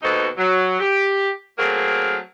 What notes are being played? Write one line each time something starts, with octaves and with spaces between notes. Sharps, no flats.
D#2 B2 D#4 F#4 A4 C5
F#3
G4
F#3 A3 A#3 C4 G#4 A#4